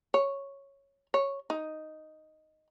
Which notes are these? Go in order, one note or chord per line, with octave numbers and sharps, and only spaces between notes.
C#5
C#5
D#4